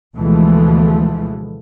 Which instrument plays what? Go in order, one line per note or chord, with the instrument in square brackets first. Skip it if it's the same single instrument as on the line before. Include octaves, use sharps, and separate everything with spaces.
[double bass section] D2 B2 E3 F3 G#3 A3